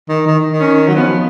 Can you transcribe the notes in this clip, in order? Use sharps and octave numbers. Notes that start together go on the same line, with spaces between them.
D#3
D#3
D#3
C#4
F#3
F3 B3